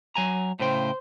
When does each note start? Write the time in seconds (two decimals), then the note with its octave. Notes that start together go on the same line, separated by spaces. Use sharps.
0.15 F#3 G#5 A#5
0.59 A2 C#3 C5 G5